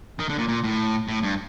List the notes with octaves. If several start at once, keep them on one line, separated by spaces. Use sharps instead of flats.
D#3
D3
A#2
A#2
A2
A2
G2